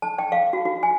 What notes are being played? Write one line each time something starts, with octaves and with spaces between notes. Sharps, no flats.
A5
G5
F5
F#4
F#4
G#5